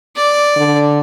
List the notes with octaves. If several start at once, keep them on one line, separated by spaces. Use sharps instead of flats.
D5
D3